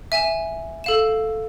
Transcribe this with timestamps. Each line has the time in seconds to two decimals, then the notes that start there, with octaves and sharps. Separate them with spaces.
0.12 E5 G#5 E7
0.84 A4 F5 E7